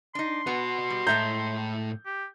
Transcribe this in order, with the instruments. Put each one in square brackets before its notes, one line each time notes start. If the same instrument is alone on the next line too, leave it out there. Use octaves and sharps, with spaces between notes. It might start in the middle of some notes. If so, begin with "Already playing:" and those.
[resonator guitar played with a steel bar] D4 D#4 [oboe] C6
[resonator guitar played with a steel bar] B3 [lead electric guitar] F#4 B4
[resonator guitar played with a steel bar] G3
[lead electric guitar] A2 A4 [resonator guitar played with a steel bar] G#3 E5 A#5 [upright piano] G6
[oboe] G4